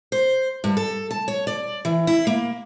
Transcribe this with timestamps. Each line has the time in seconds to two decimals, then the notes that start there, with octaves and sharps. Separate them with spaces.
0.12 C5
0.64 G2
0.77 A4
1.11 A5
1.28 C#5
1.47 D5
1.85 E3
2.07 E4
2.27 A#3